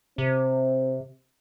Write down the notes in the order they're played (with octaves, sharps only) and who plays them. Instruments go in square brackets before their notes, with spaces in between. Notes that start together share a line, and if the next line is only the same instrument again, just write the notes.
[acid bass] C3 [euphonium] C4